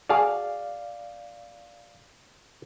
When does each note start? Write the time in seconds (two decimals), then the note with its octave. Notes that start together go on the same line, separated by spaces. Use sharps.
0.09 F#4 G#4 D5 F5